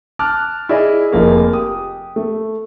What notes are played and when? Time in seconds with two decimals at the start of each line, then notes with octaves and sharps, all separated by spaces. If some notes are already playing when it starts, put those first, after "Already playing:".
0.19 A5 D6 F6 F#6
0.69 E4 G#4 D5 D#5
1.11 F1 F3 A#3 G#4
1.53 G4 D#6
2.16 A3